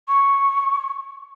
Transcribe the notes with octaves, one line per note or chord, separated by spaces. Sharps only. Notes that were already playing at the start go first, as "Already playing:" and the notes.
C#6